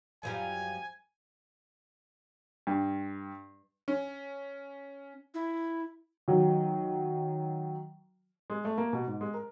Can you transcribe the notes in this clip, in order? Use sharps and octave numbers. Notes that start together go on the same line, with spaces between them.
F#2 F3 G3 G#5
G2
C#4
E4
D#3 F#3
G#3
A3
A#3
B2
G#2
G#3
A#4